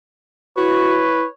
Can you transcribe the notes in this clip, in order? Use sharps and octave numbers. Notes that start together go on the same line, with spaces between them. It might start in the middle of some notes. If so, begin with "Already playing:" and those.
E4 F#4 B4 C#5